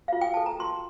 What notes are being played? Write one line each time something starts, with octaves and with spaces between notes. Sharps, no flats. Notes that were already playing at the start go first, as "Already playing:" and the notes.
F4 F5
G5
A4 A5
A#5
F4 C6